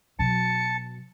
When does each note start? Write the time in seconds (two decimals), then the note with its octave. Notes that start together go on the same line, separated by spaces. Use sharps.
0.19 B2 F#3 A5 C#7